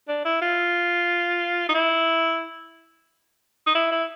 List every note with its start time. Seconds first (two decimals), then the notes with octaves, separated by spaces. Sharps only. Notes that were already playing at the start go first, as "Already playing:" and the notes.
0.08 D4
0.25 E4
0.41 F4
1.69 D#4
1.74 E4
3.67 D#4
3.75 E4
3.91 E4